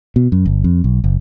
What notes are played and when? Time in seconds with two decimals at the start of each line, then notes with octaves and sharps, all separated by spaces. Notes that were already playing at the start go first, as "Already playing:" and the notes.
0.16 B2
0.32 F#2
0.46 G1
0.64 F2
0.84 B1
1.04 F#1